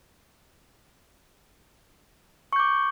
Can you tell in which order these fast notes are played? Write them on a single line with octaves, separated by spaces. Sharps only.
C#6 G6 D6